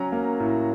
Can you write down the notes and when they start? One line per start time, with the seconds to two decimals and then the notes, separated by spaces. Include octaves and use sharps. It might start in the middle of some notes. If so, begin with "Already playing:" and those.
Already playing: F#3 C#4 A#5
0.12 A#3
0.40 A2